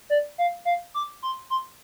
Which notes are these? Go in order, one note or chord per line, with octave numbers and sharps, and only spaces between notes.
D5
F5
F5
D6
C6
C6